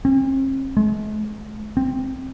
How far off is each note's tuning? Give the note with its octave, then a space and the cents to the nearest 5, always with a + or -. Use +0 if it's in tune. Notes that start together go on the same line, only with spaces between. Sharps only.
C4 +45
G#3 +45
C4 +5